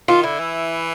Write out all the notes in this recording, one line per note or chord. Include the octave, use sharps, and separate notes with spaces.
D#3 F4
D3 E4
E3